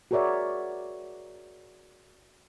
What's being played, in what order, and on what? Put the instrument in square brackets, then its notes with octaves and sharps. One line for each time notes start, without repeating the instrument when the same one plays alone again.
[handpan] F#4 G#4 A#4 C#5 D5 E5